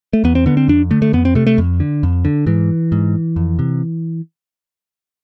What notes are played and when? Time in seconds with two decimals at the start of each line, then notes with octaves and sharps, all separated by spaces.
0.13 A3
0.24 E2 B3
0.35 C4
0.46 D3 B3
0.57 C4
0.68 F2 D4
0.91 D3 A3
1.02 A3
1.13 F2 B3
1.25 C4
1.35 C3 A3
1.47 A3
1.58 F2
1.80 D3
2.03 F2
2.25 D3
2.47 G#2 E3
2.92 G#2
3.36 F2
3.59 C3